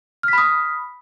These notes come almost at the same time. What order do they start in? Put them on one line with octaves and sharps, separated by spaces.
F6 B6 B5 D#6